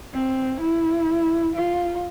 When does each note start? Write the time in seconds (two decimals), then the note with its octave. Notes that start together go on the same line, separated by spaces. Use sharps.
0.14 C4
0.61 E4
1.55 F4